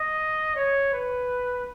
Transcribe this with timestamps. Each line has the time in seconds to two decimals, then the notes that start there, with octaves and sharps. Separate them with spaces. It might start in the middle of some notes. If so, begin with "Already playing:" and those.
Already playing: D#5
0.56 C#5
0.93 B4